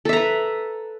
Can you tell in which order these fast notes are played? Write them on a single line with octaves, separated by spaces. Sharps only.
A4 E5 A#5 B4